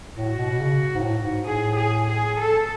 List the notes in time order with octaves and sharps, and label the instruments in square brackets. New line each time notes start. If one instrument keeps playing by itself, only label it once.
[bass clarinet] A2 [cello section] F#4
[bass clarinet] B2
B2
C#3
G#2
A2
G#2
[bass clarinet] A2 [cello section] G#4
[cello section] G#4
G#4
A4